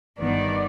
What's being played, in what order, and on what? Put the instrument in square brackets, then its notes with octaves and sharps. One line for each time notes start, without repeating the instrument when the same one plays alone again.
[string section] G1 G2 D#3 B3 [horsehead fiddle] D5